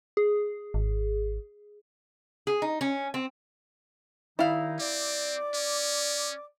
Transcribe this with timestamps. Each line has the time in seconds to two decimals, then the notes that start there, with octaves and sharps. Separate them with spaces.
0.17 G#4
0.74 G#1
2.47 G#4
2.62 D#4
2.81 C#4
3.14 C4
4.39 D#3 G3 D#4 E4 F5
4.79 C4 D5 D6
5.54 C#4